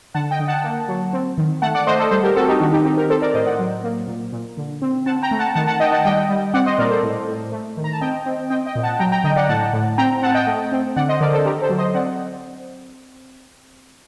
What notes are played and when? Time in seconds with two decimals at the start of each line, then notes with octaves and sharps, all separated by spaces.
0.14 D3 F#5 A5
0.31 D#5 G5
0.39 D3
0.48 F#5 A5
0.64 A#3
0.88 F#3
1.13 C4
1.38 D#3
1.62 A3 F#5 A5
1.75 D5 F#5
1.87 A3 C5 D#5
1.99 A4 C5
2.11 G3 A4 C5
2.23 G4 A#4
2.36 C4 F#4 A4
2.48 D#4 G4
2.60 D#3 D4 F#4
2.73 D#4 G4
2.85 C4 D#4 G4
2.97 G4 A#4
3.10 C4 A4 C5
3.22 A#4 D5
3.34 A2 C5 D#5
3.46 D5 F#5
3.59 F#3
3.84 A#3
4.08 A#2
4.32 A#2
4.57 D3
4.82 C4
5.06 C4 F#5 A5
5.22 G5 A#5
5.31 A3
5.39 F#5 A5
5.55 D#3 F#5 A5
5.67 F#5 A5
5.80 D#3 D#5 G5
5.92 F#5 A5
6.05 G3 D#5 G5
6.29 G3
6.54 C4 D5 F#5
6.66 C5 D#5
6.78 A#2 A#4 D5
6.91 A4 C5
7.03 A2
7.28 A2
7.52 A3
7.77 D#3
7.84 A#5
7.92 A5
8.01 C4 D#5 G5
8.26 C4
8.50 C4 D#5 G5
8.66 D#5 G5
8.75 A#2
8.83 F#5 A5
8.99 F#3 G5 A#5
9.12 G5 A#5
9.24 D3 D#5 G5
9.36 D5 F#5
9.49 A2 F#5 A5
9.73 A2
9.98 C4 G5 A#5
10.22 C4 F#5 A5
10.34 D#5 G5
10.47 A3
10.72 C4
10.96 D3 D5 F#5
11.09 C5 D#5
11.21 D3 A#4 D5
11.33 A4 C5
11.46 D3 G4 A#4
11.62 A4 C5
11.70 F#3
11.78 C5 D#5
11.94 C4 D5 F#5